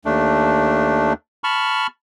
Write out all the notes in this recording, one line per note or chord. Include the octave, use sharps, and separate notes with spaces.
D#2 A3 D4
A5 B5 C#6 F6